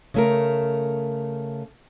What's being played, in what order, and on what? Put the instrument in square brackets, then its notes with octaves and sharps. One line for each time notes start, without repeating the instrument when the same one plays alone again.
[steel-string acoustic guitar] C#3 A3 A#4